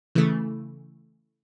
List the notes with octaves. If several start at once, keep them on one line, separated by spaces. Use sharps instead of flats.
C#3 E3 A3